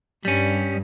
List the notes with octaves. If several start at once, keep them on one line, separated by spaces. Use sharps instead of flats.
G2 G3 C#4